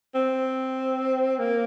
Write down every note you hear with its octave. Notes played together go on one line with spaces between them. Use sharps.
C4
A#3